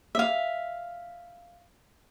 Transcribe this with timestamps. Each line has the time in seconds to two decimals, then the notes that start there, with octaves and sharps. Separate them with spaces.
0.15 E5 F5